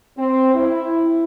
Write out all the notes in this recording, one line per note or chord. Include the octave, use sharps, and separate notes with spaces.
C4
E4